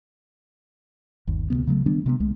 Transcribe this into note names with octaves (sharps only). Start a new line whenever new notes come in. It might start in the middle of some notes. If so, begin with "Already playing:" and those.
G1 D#2
D2 C3 D#3 B3
C#3 F#3 G#3 A3
D#3 G3 B3 D4
C3 A3 B3
C2 G#3 A3